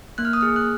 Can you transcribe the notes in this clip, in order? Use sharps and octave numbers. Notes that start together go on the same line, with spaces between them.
A#3 F#6
F6
D#6
G#4 F6
F#6